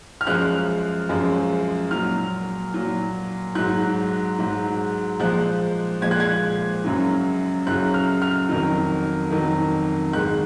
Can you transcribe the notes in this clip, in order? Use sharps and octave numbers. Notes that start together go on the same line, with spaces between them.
F6
F#2 F3 G#3 F#6
F#2 F3 G#3
A#2 F#3 F6
A#2 F#3
G#2 F#3 F#6
G#2 F#3
A#2 F3 G#3 F#6
A#2 F3 G#3 G#6
F#6
G#6
F#2 C#3 F#3
F#2 C#3 F#3 F#6
F6
F6
F2 D#3 F#3
F2 D#3 F#3
G#2 D#3 G#3 F#6